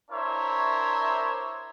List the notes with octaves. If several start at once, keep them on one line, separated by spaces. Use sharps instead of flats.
D4 E4 A#4 C5 C#5 E5